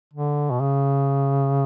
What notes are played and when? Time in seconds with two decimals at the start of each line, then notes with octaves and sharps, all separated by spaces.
0.13 D3
0.51 B2
0.60 C#3